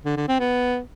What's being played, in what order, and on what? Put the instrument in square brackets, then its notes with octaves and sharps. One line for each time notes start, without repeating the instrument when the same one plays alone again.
[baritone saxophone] D3
D3
C4
B3